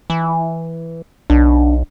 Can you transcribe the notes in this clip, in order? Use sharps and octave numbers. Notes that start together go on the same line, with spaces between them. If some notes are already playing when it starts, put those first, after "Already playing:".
E3
B1 D4